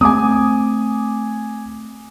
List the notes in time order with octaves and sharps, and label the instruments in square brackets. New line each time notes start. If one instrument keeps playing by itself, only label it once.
[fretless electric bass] A3 C4 [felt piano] G#5 D6 D#6